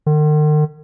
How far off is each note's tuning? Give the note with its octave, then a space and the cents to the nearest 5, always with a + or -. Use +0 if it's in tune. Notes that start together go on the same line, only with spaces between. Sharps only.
D#3 -45